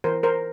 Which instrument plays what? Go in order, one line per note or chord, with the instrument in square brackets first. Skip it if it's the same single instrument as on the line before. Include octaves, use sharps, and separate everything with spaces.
[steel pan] E3 A#4 C5
A#4 C5